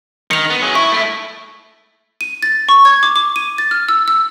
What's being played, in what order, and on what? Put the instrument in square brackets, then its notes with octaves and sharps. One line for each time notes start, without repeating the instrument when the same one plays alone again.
[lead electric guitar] D#3 [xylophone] C#7 F7
[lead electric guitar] B3
F#3 G#4
[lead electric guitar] E4 [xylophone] C#6
[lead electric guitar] A3 E4
[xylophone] D#7
A6
C#6
G#6
D6
D6
D#7
A6
F6
E6
E6